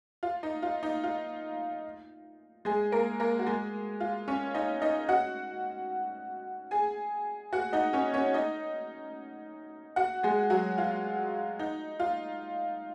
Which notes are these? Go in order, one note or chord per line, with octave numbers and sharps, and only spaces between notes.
F4
D#4
F4
D#4
F4
G#3 G#4
A#3 A#4
A#3 A#4
F#4
G#3 G#4
F4
C#4 C#5
D#4 D#5
D#4 D#5
F#4 F#5
G#4 G#5
F#4 F#5
D#4 D#5
C#4 C#5
C#4 C#5
D#4 D#5
F#4 F#5
G#3 G#4
F#3 F#4
F4
D#4
F4